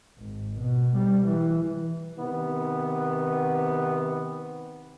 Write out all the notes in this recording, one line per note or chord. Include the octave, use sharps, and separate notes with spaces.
G#1
B2
G3
E3
C3 D#3 B3